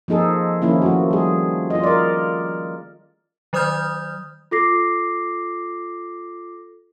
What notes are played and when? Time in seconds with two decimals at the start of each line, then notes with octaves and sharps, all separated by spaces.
0.08 F3 A#3 D#4 G#4 A4
0.62 D#3 F3 A#3 C#4 E4
0.82 F3 A3 F#4
1.11 G3 G#4
1.70 F4 D#5
1.83 A#4 D5
3.53 D#3 F#3 C5 D#6 F6 G6
4.51 F4 A4 D6 A#6 C7